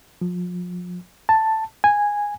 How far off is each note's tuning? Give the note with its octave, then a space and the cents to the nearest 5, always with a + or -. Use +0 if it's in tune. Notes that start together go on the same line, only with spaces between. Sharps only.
F3 +35
A5 +5
G#5 -10